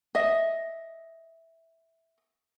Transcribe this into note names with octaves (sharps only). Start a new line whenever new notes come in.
D#5 E5